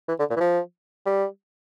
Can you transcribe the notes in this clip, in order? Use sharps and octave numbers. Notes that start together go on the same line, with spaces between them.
E3
D3
A#2
E3
F3
G3